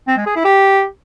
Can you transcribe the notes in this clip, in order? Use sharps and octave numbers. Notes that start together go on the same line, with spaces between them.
C4
G#3
G#4
E4
G4